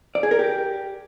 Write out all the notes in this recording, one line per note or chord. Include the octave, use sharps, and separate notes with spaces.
D5
G#4
A#4
G4